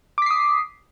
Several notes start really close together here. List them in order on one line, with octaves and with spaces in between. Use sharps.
D6 B6 C7 D#6